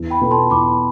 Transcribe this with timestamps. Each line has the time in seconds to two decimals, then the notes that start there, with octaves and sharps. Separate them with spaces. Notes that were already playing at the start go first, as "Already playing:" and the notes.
Already playing: E2
0.10 G5 B5
0.21 B2 B3 F4 A4
0.31 A5 C6
0.50 E2 B5 D6